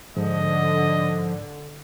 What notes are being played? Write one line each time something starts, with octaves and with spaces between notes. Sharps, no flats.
G#2 D3 F3 D#5